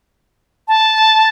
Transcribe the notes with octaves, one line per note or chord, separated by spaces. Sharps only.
A5